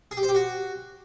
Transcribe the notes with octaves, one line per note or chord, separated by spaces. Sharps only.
G#4
G4
C5
G4
F#4